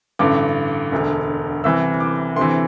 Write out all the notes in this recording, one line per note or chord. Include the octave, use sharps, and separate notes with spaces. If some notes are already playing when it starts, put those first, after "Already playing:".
A1 G2 D3 D6
E1 D2 D3
C2 C3 E3 E6
D6
D2 C3 E3 C6